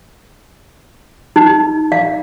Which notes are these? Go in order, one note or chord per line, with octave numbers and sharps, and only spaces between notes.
D#4
F5